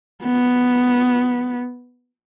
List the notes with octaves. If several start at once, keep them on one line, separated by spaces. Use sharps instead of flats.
B3